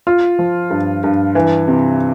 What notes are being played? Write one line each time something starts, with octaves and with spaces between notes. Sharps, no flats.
F4
F3
G2
G2
E3
C3